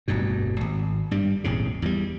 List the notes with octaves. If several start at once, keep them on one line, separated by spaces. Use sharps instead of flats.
D1 G1 G2 B2
G#1
G2 G3
D#1 G#1 E2 C#3
E2 G3